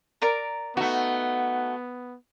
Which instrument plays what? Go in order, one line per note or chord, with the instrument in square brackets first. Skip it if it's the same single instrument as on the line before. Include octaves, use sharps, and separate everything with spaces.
[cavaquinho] A#4 D5 A#5
[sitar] A3 F#4 [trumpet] B3 [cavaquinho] D#4